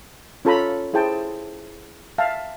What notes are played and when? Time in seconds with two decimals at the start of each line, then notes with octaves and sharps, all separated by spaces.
0.45 C#4 F4 A4 C#5 A#5 B5
0.93 E4 G#4 C5 G5 A5
2.18 E5 F5 A5